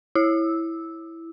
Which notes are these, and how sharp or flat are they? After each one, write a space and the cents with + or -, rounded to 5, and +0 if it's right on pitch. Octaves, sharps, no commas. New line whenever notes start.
E4 +0 E6 -10